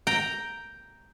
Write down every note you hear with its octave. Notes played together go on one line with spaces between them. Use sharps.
G5 A#5